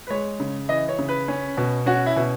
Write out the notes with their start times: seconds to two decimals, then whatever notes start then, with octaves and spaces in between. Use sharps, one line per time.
0.07 B4
0.10 G#3 C#5
0.40 C#3
0.69 E3 D#5
0.89 C#5
0.99 C#3
1.09 B4
1.28 C#4
1.57 B2
1.86 C#4 F#4
2.06 E4
2.16 B2